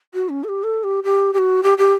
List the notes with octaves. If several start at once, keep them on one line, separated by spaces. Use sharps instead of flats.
F#4
C#4
A4
G4
A4
G4
G4
G4
F#4
G4
G4